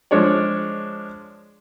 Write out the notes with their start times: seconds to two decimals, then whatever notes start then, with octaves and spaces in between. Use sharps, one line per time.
0.11 F3 G#3 D4 C#5 D5